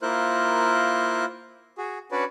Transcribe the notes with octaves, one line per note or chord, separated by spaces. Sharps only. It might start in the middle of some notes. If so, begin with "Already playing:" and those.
A#3 E4 F4 A#4 C5 F#6
F#4 G#4
C#4 D4 F#4 B4 C#5 D5